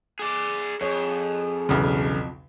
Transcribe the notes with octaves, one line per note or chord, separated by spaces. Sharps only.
G#4 D5
F2 G#4 C#5
B1 E2 C#3